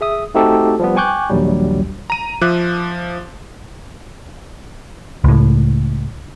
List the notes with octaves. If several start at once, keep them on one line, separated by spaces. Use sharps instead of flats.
G#4 E5 D#6
A3 C4 D#4 F#4 G4 A4
F3 G3 B3
G5 G#5 C#6 D6 F#6 G6
A#1 D#2 F#3 G3
A#5 D#7
F3 E5 D6 F#6
C#2 A2